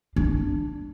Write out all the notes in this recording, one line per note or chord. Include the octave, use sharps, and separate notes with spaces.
D4